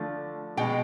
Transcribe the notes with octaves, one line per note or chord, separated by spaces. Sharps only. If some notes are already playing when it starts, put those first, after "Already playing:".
Already playing: D3 F3 A3
B2 G#3 G5